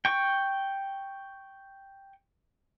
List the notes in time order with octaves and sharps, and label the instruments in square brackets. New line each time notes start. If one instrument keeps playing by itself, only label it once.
[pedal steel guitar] G5 C#6